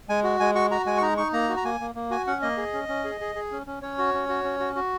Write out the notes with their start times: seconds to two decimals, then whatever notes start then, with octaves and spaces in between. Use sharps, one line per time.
0.09 G#3 G#5
0.24 F#4
0.40 G#3 G#5
0.55 F#4 C#6
0.71 F#4 A#5
0.86 G#3 G#5
0.98 C#6
1.02 D#4 A#5
1.17 D#4 C#6
1.33 A#3 A#5
1.49 F#4
1.57 A#5
1.64 A#3 G#5
1.80 A#3
1.95 A#3
2.11 F#4 G#5
2.27 C#4 F#5
2.42 A#3 D#5
2.57 G#4
2.74 C#4
2.88 C#4
3.04 G#4
3.21 G#4
3.35 G#4
3.52 C#4
3.67 C#4
3.82 C#4 C#5
3.98 F#4
4.14 C#4
4.29 F#4
4.44 C#4
4.60 F#4
4.75 F#4